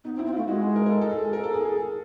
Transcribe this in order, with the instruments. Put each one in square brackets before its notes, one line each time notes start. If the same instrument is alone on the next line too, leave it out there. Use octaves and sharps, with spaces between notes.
[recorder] B3 [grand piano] D#4
[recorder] C4
[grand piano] E4
[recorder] C4
[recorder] A3 [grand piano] F4
[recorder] G#3 [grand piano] F#4
[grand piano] G#4
A#4
A#4
A4
A4
G#4
G#4
A#4
A4
G#4
G#4